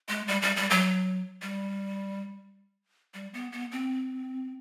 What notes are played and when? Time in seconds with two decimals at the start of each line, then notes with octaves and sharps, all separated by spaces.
0.09 G#3
0.28 G3
0.42 G3
0.56 G3
0.70 F#3
1.42 G3
3.14 G3
3.34 B3
3.52 B3
3.72 C4